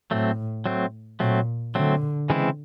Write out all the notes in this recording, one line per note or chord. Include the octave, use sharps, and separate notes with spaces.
A2 F#3 A3 C4
F#3 A3 C4
A#2 F#3 A3 C4
D3 F#3 A3 C4
C#3 E3 G#3 C4 E4